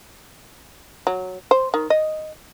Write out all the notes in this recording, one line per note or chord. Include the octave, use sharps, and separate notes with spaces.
F#3
C5
D#3
D#5